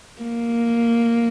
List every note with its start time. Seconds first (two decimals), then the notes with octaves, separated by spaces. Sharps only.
0.22 A#3